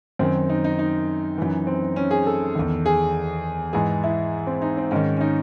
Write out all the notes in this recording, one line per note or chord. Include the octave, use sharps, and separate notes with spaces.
F#2 D#3 C4
D#4
D#4
D#4
F#2 E3
C4
C#4
G#4
A4
E2 D#3
G#4
G#2 E3 G#4
E4
C4
D#4
C4
G#2 D#3 C#4
C#4
D#4